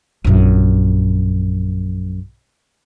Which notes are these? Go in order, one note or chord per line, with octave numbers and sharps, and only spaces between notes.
A#1 F#2